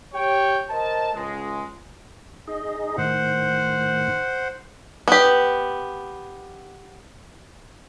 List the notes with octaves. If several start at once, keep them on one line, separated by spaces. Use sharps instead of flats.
G4 C#5 G5
A#4 C5 D#5 A5
C#2 G#3
D#4 G#4 D#5
A2 D#3 C5 F#5
B3 G4